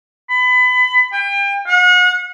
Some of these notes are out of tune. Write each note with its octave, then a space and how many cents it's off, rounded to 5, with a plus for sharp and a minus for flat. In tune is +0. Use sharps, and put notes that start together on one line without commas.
B5 +25
G5 +35
F#5 -40